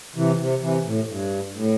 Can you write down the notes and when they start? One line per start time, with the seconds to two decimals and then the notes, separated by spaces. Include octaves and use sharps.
0.16 C3 E3
0.38 C3
0.61 C3 E3
0.85 A2
1.08 G2
1.54 A2